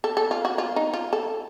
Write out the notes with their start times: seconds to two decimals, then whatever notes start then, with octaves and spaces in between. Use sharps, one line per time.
0.04 A4
0.17 A4
0.31 F4
0.45 F#4
0.58 F4
0.76 D#4
0.94 F4
1.13 A4